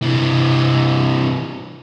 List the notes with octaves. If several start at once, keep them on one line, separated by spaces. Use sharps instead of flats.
C3 E3